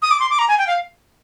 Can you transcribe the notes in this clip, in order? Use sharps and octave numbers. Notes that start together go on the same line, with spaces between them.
D#6
D6
C6
D6
A#5
G#5
G5
F5